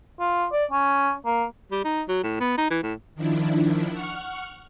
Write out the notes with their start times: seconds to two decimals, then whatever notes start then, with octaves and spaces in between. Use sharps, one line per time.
0.20 F4
0.52 D5
0.71 C#4
1.25 A#3
1.72 G3
1.84 D#4
2.08 F#3
2.23 A2
2.40 B3
2.57 D#4
2.70 E3
2.83 A2
3.15 D#3 F3 D4 E4
3.92 F#5 C#6 F6